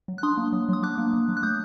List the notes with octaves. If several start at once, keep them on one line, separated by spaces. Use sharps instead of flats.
F#3
F#6
D4 C6 D#6
A#3
F#3
F#3 D#6
D4 D6 F#6
A#3
F#3
F#3
F#6
A3 D#6 G6